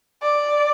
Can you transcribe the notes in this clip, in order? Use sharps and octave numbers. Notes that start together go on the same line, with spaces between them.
D5